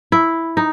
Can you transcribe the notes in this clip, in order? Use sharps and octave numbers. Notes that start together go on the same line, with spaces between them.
E4
D#4